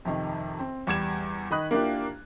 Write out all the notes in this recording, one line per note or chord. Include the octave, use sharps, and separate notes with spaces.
F2 C3 D#3
C4
E2 G3 D6 G#6 E7
D#3 D#5 B5 D#6 F#6
A#3 D4 E4 F4 G4